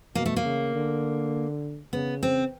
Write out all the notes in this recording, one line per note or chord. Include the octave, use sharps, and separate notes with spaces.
B2 A#3
A3
A#3
C#3
D3
C#3 B3
C4